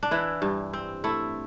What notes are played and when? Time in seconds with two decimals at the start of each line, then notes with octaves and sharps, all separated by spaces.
0.03 D4
0.11 E3 E4
0.42 G2
0.73 C4
1.04 A3 E4